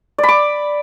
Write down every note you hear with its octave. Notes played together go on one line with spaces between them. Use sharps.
D5
B5
D6